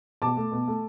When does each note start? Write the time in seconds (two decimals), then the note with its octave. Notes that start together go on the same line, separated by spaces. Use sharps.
0.22 B2 A5 D6
0.37 A3
0.52 B2
0.68 A3